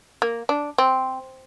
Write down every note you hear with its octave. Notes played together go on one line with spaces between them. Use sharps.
A#3
D4
C4